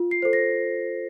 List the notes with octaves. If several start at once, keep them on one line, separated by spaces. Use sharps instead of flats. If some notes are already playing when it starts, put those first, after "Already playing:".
Already playing: F4
C7
A4 C5
A#6